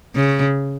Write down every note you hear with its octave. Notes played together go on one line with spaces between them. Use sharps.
C#3